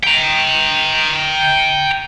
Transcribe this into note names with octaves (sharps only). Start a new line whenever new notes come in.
G5 A#5